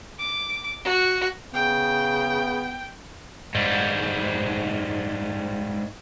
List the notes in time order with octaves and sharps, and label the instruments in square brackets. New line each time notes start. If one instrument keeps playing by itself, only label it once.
[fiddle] D6
F#4
[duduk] C#3 [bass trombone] B3 [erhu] G5
[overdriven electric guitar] G#2 G3